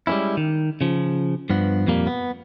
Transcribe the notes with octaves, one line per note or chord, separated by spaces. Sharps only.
G3 G#3 A#3 C#4 E4
D#3
C#3 F3
G2 F3 B3
F2 A#2 G3 A#3
B3